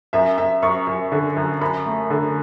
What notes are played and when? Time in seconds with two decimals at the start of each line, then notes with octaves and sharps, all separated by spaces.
0.13 F#2 E5
0.38 F#2 E5
0.62 F#2 C#6
0.87 F#2
1.12 D3
1.37 F#2
1.61 F#2 B5
1.86 A3
2.10 D3